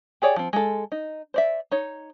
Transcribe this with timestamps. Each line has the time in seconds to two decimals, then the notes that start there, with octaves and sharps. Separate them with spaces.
0.22 G4 G#4 C#5 D5
0.36 F3 C4
0.53 G#3 A4
0.92 D#4
1.34 C5 D5 E5
1.71 D#4 C#5